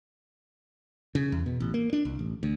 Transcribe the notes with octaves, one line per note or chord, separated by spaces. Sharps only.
C#3
E2
B2
A1
A#3
D4
C2
A1
D2